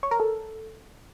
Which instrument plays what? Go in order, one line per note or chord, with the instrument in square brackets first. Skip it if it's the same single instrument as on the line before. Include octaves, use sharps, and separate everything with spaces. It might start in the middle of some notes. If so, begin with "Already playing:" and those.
[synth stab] C#5
A#4
A4